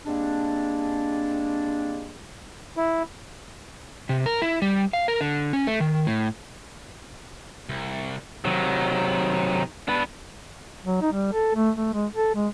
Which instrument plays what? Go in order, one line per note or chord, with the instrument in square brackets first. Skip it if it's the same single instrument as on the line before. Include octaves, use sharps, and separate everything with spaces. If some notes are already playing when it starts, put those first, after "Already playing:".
[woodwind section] G3 G#3 A#3 C4 D4
[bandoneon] E4
[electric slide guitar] C3
A#4
E4
G3
F5
A#4
D3
C#4
A3
D#3
A2
[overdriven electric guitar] C2
[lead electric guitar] C3 F#3 [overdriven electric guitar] D#3
[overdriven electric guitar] B3 [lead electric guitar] D4 B4
[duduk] F#3
D#4
G3
A4
A3
A3
G#3
A4
G#3